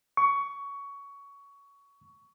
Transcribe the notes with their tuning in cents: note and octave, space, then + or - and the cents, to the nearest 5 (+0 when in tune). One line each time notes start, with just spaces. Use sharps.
C#6 +20